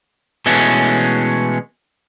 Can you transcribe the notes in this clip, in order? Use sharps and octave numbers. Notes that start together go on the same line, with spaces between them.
B2 E3 G#3 A3 C#4